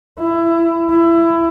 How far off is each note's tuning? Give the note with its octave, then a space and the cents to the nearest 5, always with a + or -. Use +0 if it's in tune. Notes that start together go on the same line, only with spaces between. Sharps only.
E4 +20
E4 +20